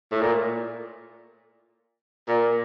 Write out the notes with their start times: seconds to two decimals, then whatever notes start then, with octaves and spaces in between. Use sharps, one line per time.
0.12 A2
0.21 A#2
2.28 A#2